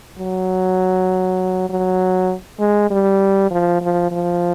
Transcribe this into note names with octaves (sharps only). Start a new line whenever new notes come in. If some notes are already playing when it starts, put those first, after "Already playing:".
F#3
F#3
G#3
G3
F3
F3
F3